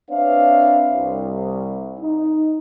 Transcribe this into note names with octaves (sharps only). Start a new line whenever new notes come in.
C4 D4 B4 C#5 E5 F5
C2
D#4